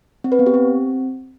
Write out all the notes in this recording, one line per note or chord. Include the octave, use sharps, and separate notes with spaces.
C4
B4
B3
G4
C4